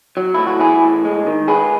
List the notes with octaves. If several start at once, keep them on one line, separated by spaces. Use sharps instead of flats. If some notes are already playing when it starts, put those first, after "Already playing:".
F#3
A2 E4
F#4
E3 E4 G#4
A2
G#3
D#3
G#3 G#4 B4